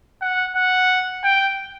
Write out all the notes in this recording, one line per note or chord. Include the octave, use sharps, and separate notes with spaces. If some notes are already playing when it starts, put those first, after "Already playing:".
F#5
F#5
G5